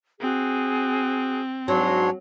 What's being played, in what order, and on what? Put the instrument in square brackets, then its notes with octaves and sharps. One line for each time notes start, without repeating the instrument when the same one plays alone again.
[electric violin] C4 [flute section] F#4 G#4
[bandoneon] G#2 D4 C#5 [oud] F#3 [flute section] C6